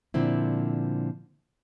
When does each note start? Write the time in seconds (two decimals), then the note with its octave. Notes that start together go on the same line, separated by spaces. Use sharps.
0.14 A#2 D3 F3 C4 E4